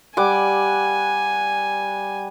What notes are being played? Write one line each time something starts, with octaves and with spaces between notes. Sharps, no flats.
G3 F#5 G#5 D6